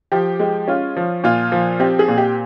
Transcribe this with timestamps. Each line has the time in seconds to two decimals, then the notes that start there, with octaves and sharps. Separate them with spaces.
0.12 F3 G4
0.40 G#3
0.68 C#4 F4
0.97 F3
1.24 A#2 F4
1.52 F3
1.80 C4 G4
1.99 G#4
2.08 A#2
2.18 G4